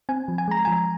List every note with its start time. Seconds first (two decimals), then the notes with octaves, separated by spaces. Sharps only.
0.09 C4 G#5
0.28 F3
0.38 G#5
0.48 G#3 A#5
0.65 F3 G#5